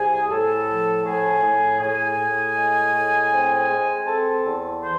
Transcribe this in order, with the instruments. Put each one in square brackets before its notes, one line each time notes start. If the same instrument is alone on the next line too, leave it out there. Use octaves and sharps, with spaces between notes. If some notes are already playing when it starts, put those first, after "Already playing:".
Already playing: [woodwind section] C2 G#4 G#5
A2 A4 A5
F3
A2 G#4 G#5
A2
A2 G#4 G#5
A2
G#3
A2
C4
G#3
C4 A4 A5
E2
E3 C5 C6